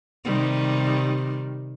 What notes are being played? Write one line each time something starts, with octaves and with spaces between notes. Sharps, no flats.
C3 D#3 G3